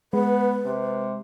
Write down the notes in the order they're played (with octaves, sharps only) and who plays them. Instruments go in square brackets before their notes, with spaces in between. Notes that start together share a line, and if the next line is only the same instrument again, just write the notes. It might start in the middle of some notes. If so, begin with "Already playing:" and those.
[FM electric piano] G#3 [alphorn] B3 [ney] B4
[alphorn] C3